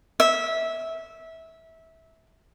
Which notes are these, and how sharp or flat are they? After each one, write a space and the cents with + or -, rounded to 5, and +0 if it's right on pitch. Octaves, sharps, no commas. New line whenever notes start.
E5 -20